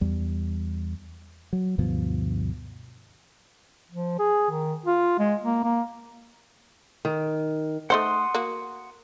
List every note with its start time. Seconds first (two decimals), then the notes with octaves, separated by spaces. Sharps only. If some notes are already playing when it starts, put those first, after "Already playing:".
0.01 E2 G3
1.53 F#3
1.78 D2 G2 B2 F3
3.92 F3
4.19 G#4
4.51 D#3
4.86 F4
5.19 G#3
5.44 A#3
5.64 A#3
7.05 D#3
7.90 A3 D#4 C5 F#5 C6 D#6
8.34 A#3 F#4